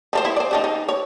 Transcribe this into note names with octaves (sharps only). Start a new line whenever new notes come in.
F3 A4 C5
E4
C5 D5
C#3 D4 D#4
D#4
C#5